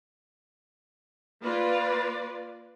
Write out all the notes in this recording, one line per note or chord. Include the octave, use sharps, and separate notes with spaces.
A#3 F4 B4 D5